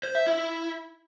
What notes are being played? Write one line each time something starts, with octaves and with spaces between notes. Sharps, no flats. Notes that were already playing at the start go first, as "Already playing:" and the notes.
C5
E5
E4